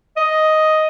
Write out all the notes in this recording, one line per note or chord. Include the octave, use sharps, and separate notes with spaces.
D#5